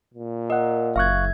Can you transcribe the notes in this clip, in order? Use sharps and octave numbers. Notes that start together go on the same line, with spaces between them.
A#2
A#4 D#5 F#5
F#1 E5 F5 C#6 F#6 G#6